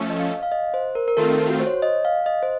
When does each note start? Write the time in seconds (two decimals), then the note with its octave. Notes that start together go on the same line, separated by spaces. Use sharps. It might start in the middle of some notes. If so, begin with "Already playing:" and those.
Already playing: F3 A3 C#4 A4
0.10 D#5
0.19 F5
0.43 F5
0.52 D#5
0.74 C5
0.95 A#4
1.08 A#4
1.17 D#3 A3 C4 F4 A4
1.50 F#4
1.60 C5
1.67 C#5
1.82 D#5
2.05 F5
2.26 D#5
2.43 C5